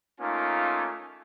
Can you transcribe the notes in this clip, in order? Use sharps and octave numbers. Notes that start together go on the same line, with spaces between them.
A3 A#3 C#4 D#4 F4